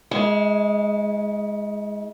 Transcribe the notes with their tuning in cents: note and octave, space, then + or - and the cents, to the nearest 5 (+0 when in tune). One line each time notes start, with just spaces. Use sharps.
G#3 +0 E4 -40